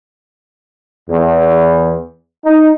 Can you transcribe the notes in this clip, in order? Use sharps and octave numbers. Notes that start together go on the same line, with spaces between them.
E2
D#4